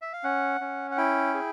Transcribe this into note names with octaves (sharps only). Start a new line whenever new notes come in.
E5
F5
C#4 F#5
C#4
F#5
E4 G5
G#4